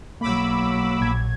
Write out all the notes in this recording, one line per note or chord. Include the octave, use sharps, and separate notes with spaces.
B1 F#3 A#3 B5 D6 E6
A#1 G#6